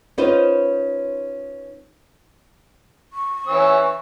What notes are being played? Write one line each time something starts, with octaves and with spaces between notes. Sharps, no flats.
C#4 D#4 F4 B4 C5
C#6
E3 C#4 E6